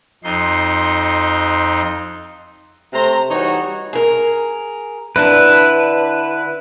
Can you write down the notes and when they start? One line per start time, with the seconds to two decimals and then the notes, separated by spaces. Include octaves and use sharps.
0.24 F2 D#4 C6
2.93 C3 A3 C5 A#5
3.30 E3 G3 D#4 F#4 C#5
3.93 G#4 A#4
5.16 D3 D4 E4 B4